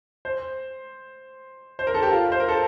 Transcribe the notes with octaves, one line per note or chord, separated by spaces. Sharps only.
C5
C5
A#4
A4
G4
F4
C5
A#4
A4